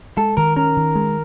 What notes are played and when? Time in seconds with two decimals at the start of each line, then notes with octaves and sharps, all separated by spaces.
0.17 G#3 A4
0.37 D#3 A#4
0.56 C#4 A#4
0.77 D#3
0.95 G#3